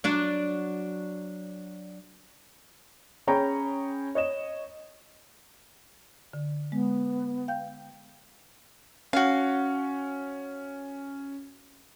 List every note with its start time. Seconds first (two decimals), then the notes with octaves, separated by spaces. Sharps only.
0.04 F#3 D4 D5
3.27 C#4 G#4 C#5 G5 A#5 B5
4.15 C#5 D#5 E7
6.33 D3
6.72 G#3 B3
7.48 F5 G5 G6
9.13 C#4 F#4 F5